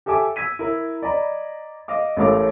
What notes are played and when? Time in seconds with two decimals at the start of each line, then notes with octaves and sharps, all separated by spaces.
0.06 G4 A4 E5 G#5 D6
0.36 E6 G#6 B6 D#7
0.59 E4 A#4
1.02 D5 D#5 A#5 B5
1.88 D#5 F5 D6
2.17 A1 A2 A3 A#4 F5 D6